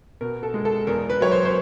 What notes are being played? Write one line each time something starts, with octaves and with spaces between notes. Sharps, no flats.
B2 A#4
A4
G#3
A4
E2 A#4
B4
F#3 C#5
C5
C5